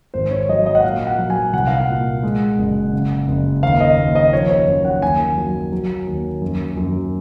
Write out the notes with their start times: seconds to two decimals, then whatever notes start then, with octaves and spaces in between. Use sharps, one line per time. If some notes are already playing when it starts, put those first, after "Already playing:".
0.14 G#1 C5
0.31 C#5
0.49 F#3 D#5
0.66 D#5
0.75 F#5
0.84 A#2 F5
1.07 F#5
1.19 F#3
1.30 G#5
1.53 C2 F#5
1.67 F5
1.80 F#5
1.89 A#2
2.23 G#3
2.58 F#1
2.93 C#3
3.28 F#1
3.63 D#2 F5
3.80 D#5
3.98 D#2
4.15 D#5
4.33 F3 C#5
4.50 C#5
4.67 F#2
4.85 F#5
5.02 D#2 G#5
5.37 F#3
5.72 F#3
6.07 D#2
6.42 F#2
6.77 F#2